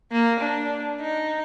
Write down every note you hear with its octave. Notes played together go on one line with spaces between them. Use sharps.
A#3
D4
D#4